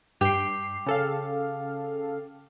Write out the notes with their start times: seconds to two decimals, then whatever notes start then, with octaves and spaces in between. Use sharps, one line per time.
0.21 G2 G4 G5 C7
0.86 C#3 A4 F5